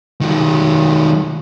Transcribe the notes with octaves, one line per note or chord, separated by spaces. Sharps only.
D#3 F#3